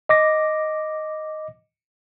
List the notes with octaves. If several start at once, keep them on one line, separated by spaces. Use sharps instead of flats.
D#5 D6 A#6